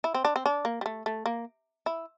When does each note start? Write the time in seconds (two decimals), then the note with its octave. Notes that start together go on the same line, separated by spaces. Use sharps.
0.04 E4
0.14 C4
0.25 D4
0.36 C4
0.46 D4
0.65 A#3
0.81 G3
0.86 A3
1.06 A3
1.26 A#3
1.86 E4